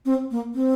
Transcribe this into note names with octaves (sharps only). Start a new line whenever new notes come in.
C4
A#3
C4